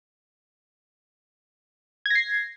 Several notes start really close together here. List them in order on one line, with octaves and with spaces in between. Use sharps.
G#6 A#6 C7